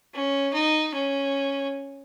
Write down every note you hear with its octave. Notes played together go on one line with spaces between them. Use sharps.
C#4
D#4
C#4